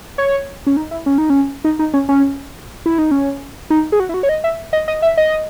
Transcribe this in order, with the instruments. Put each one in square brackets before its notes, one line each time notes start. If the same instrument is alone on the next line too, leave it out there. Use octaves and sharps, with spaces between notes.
[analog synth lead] C#5
C#4
D#4
E4
C#4
D#4
C#4
D#4
D#4
C#4
C#4
E4
D#4
C#4
D#4
G#4
F#4
E4
F#4
C#5
D#5
E5
D#5
D#5
E5
D#5